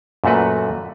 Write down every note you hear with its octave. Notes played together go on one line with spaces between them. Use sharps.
F#2 A#2 A3 F#4 B4